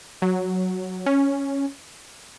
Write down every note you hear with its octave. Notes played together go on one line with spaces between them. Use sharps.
F#3
C#4